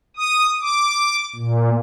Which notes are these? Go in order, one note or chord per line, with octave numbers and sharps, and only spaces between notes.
D#6
D6
A#2